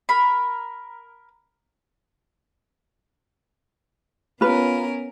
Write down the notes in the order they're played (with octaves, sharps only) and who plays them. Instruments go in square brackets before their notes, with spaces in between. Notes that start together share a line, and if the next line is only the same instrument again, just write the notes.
[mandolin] A#4 B5
[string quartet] B3 C#4 A#4 [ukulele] F4 B4